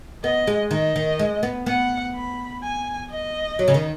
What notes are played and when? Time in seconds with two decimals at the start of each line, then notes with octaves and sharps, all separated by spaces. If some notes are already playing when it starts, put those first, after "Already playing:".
0.24 B3 D#5
0.47 G#3
0.71 D#3 D#5
0.96 D#3
1.19 G#3
1.43 B3
1.66 B3 F#5
2.15 B5
2.63 G#5
3.10 D#5
3.59 F#3
3.68 C#3
3.74 D#3